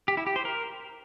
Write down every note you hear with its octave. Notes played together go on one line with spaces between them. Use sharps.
G4
E4
G4
C5
A#4